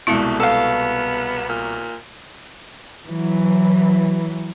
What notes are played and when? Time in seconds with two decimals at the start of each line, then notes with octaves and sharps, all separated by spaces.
0.07 C2 B2 G#3 A3 E4
0.40 B3 A4 F5
1.48 A#2
3.09 E3 F#3